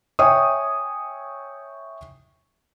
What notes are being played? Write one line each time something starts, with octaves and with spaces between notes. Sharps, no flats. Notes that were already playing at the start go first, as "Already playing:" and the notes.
C#5 E5 G5 G#5 C#6 D#6